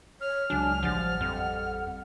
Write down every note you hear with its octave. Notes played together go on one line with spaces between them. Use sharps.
C#5 F6
C#2 F#3 D4 G#5
A1 F3 G3 F#5 A6
F2